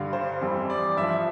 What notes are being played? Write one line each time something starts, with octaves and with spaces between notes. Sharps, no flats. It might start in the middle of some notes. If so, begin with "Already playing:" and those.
Already playing: G2 D3 G3 F5
C5
F2 E3 G3
D5
G2 F3 E5